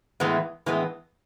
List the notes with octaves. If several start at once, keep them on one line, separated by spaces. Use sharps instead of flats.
A2 E3 G#3 B3
A2 E3 G#3 B3